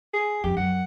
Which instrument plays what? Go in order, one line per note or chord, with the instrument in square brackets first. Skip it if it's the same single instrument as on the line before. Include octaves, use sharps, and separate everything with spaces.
[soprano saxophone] G#4
[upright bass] F2 C#4 [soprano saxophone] G4
[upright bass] F#2 [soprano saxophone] F#5